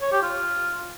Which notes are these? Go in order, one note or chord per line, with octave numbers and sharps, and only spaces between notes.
C#5
G4
F4